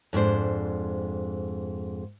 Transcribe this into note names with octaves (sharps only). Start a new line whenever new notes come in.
F2 G#2 D4 C5